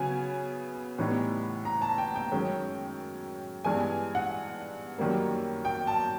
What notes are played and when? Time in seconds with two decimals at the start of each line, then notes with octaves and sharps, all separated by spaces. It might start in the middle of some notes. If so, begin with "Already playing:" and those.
Already playing: C#3 F#3 B3 G#5
0.98 A2 E3 G3 B3 D#4
1.65 A#5
1.82 A5
1.98 G5
2.16 G5
2.32 F#2 D#3 G#3 C#4
3.64 G2 E3 G#3 B3 D4 G#5
4.15 F#5
4.98 F#2 D#3 G3 A#3
5.65 G5
5.87 A5